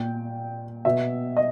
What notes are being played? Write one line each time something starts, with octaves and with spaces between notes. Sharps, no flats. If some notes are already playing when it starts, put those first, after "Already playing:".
Already playing: A#2 G5
B2 E5
D#5